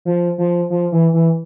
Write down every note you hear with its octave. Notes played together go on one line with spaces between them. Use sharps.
F3
F3
F3
E3
E3